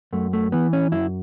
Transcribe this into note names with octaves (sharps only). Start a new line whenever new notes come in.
F#2 A3
A3
E3 B3
C#4
F#2 E4